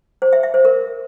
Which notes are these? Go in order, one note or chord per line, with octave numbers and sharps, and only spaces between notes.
C5
E5
E5
C5
A#4